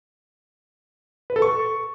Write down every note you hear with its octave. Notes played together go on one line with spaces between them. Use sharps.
B4
A4
C#6